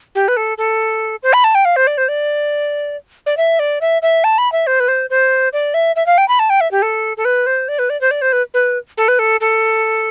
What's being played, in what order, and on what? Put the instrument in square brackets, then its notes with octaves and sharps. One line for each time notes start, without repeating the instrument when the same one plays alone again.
[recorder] G4
B4
A4
A4
C5
B5
A5
G5
F5
C5
D5
C5
D5
D5
E5
D5
E5
E5
A5
B5
E5
C5
B4
C5
C5
D5
E5
E5
F5
G5
B5
A5
G5
E5
G4
A4
A4
B4
C5
D5
B4
D5
C5
D5
C5
B4
B4
A4
B4
A4
A4